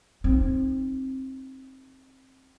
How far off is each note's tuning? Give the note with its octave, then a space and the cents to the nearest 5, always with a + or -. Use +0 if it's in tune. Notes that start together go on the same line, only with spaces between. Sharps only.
C4 +15 D#4 +0